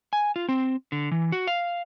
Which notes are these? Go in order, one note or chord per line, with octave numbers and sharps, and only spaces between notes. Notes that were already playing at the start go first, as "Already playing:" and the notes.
G#5
F4
C4
D3
E3
F#4
F5